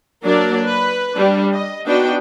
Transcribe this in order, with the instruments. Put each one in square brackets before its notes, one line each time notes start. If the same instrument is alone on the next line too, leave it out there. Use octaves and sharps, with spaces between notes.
[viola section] F#3 A#3 D4 A#4 D5
B4
G3 D4
D#5
B3 D4 D#4 F#4 G5